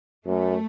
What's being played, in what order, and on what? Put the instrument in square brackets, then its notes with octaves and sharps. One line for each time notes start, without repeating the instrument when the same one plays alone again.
[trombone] F#2 [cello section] A3